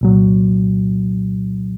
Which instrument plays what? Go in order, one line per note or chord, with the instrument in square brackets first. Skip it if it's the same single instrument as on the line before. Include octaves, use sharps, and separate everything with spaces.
[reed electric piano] C2 A#2 F#3